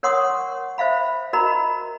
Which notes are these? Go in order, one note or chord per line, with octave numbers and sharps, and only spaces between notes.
A#4 C#5 F#5 C6 C#6 D#6
C5 E5 F5 B5
F#4 A#4 D#5 A#5 B5